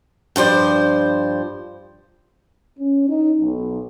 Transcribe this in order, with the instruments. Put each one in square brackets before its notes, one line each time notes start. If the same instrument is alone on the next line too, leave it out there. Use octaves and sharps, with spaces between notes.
[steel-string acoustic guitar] G2 F3 C5 D5
[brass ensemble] C#4
D#4
B1